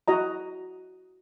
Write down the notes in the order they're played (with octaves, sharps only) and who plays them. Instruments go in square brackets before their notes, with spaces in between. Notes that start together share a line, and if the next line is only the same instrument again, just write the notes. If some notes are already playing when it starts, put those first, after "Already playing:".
[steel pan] E4 F#4 D#5 A#5